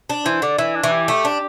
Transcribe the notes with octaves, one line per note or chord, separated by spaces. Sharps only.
D4
E3 C5
D3 D5
E3 E5
D4
E3
G4
A3
D4